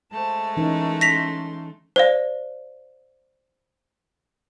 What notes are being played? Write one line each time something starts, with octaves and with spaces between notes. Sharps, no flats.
G#3 A3 C5 A5
E3 C#4 D#4 A#4
C#4 C6 A#6 B6 F7
C5 D5 F5